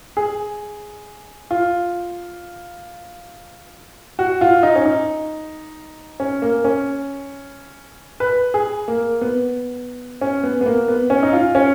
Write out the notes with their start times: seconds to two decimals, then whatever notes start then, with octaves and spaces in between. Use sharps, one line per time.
0.17 G#4
1.51 F4
4.19 F#4
4.41 F4
4.63 D#4
4.76 C#4
4.86 D#4
6.20 C#4
6.42 A#3
6.64 C#4
8.20 B4
8.54 G#4
8.88 A#3
9.21 B3
10.21 C#4
10.43 B3
10.61 B3
10.66 A#3
10.88 B3
11.10 C#4
11.23 D#4
11.33 F4
11.55 C#4